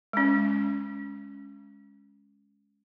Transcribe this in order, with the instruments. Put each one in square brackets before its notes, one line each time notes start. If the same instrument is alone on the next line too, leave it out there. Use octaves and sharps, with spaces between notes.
[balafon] G#3 C#4